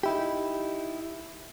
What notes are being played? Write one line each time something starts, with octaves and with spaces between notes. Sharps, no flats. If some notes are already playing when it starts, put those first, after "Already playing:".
D#4 E4 G4